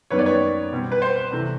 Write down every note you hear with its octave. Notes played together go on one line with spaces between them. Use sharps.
F#2 D#3 G3 B3 B4 C#5
D5
B4 C#5
B2 G3 C4
B4
C5
C3 E3 A3